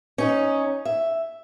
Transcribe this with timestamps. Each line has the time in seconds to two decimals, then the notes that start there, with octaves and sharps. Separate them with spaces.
0.18 C#4 D#4
0.85 E5